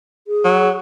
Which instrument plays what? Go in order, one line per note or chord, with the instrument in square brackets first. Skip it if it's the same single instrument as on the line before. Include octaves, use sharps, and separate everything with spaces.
[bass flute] G#4
[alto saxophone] F#3